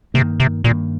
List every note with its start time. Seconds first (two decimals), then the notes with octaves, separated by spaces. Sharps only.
0.14 G2 C3 D#3 A#3
0.40 C3
0.64 G2 A#2 D#3 A#3